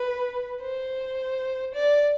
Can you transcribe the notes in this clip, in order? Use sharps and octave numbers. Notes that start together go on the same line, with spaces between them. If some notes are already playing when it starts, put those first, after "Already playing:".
Already playing: B4
C5
D5